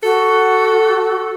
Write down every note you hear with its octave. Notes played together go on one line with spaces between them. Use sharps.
F#4 A4